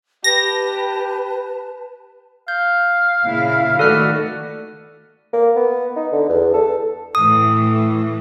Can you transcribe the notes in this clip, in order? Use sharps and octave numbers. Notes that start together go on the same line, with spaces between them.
G4 B4 A5 A#6
F5 G6
A#2 C#3 E4
D#3 A3 F#4 A4 B4 D5 F6
A#3
B3
D#4
D3
E2
A4
A2 E3 D#6